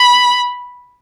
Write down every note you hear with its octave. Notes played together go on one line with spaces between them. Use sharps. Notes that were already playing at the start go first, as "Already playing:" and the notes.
Already playing: B5